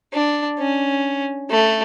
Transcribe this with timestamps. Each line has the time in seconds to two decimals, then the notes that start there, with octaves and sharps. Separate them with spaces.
0.13 D4
0.59 C#4
1.50 A3